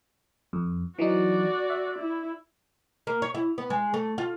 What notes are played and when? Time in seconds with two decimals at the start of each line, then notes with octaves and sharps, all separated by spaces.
0.53 F2
0.99 E3 F#3 D#4 F#4 D5
1.70 E5
1.99 E4
3.07 A#3
3.22 C#5
3.34 E4
3.58 B3
3.70 G#3
3.94 A3
4.18 F4